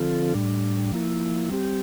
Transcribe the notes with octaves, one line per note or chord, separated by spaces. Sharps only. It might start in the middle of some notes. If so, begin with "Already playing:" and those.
Already playing: D3 F3 C4 F4 A4
A2 G3 D4
F3 A#3 E4
G3 C4 G4